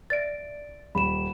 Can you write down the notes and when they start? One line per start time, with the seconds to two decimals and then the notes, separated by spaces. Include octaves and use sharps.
0.10 B4 D5 E5 A6 D7
0.95 D#1 B5 E7